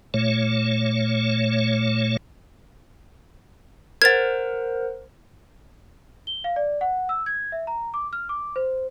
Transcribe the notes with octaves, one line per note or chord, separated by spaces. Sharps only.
A#2 A3 C#5
A#4 C5 F#5 G#6 A6
G7
F5
D5
F#5
E6
G#6
E5
A#5
D6
F6
D6
C5